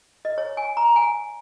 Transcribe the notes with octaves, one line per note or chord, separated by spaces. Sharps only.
D#5
C#5
G#5
A#5
G#5